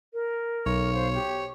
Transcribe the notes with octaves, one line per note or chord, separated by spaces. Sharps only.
A#4
B1 C#5
C5 F5
G4